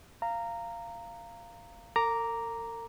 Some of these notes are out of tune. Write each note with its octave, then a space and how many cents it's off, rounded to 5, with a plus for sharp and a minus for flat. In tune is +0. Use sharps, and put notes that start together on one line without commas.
F5 -15 A#5 -10
A#4 -45 A#5 +0 D6 -10